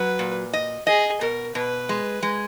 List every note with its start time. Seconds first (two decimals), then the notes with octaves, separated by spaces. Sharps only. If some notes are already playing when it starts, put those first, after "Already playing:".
Already playing: F#3 B4
0.19 A#2
0.53 D#5
0.87 G#4 D#5
1.21 B2 A#4
1.55 B2 B4
1.89 G#3
2.23 G#3